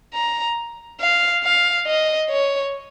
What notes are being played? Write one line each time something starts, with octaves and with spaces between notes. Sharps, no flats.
A#5
F5
F5
D#5
C#5